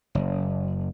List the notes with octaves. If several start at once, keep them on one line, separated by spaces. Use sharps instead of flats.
F#1